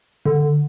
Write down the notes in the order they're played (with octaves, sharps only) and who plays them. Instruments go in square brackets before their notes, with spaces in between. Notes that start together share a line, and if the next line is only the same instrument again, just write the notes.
[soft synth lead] D3